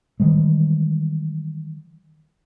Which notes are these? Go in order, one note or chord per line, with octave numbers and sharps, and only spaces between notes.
D#3 E3 G3 G#3